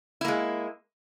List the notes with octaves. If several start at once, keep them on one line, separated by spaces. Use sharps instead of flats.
G#3 A#3 E4